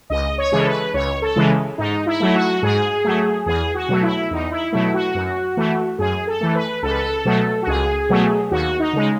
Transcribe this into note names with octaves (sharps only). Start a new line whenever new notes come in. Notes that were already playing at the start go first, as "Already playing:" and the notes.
C#2 D#5
C#5
C#3 E3 G#3 G#4
A4
B4
C#2 C#5
A4
C#3 E3 G#3
G#2 D#4
E4
F#3 A3
F#4
G#2 G#4
F#3 A3
E2 G#4
F#4
B2 F#3 A3
E4
E2 D#4
E4
B2 F#3 A3 E4
F#4
F#2
E3 A3
F#2 G#4
A4
E3 A3
B4
C#2 A4
B4
A4
B2 F#3 A3
F#4
C#2 G#4
B2 F#3 A3
D#2 F#4
D#4
C#3 G#3